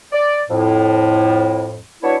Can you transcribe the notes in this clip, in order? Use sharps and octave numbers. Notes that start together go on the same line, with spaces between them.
D5
F2 A2
F#3 B3 D4 E4 C#5